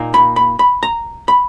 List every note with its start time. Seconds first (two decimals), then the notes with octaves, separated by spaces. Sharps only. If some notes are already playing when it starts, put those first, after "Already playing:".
Already playing: A#2 A#3 D#4
0.14 B5
0.36 B5
0.59 B5
0.83 A#5
1.28 B5